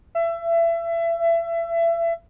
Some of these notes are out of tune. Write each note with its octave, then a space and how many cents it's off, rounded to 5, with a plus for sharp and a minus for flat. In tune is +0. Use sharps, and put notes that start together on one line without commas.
E5 +30